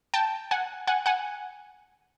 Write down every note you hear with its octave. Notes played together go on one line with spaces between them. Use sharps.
G5 A5
F#5 G#5
F#5 G#5
F#5 G#5